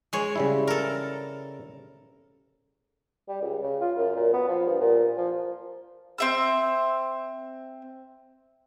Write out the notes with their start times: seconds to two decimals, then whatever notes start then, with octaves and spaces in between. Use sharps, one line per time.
0.13 G#3 C#5
0.36 C#3 G3 E4
0.67 A4 A#4
3.28 G3
3.41 C#2
3.62 C#3
3.81 F4
3.97 F#2
4.16 A#2
4.33 B3
4.48 F3
4.66 G2
4.81 A#2
5.18 F3
6.18 C4 E5 E6